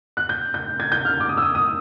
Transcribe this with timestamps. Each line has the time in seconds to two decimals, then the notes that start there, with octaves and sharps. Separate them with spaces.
0.17 F#6
0.29 G6
0.54 G6
0.80 G#6
0.92 G6
1.05 F6
1.20 D6
1.29 D#6
1.37 E6
1.42 D#6
1.55 D#6